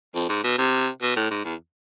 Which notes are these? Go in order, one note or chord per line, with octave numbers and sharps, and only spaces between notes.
F2
G#2
B2
C3
B2
A2
G#2
E2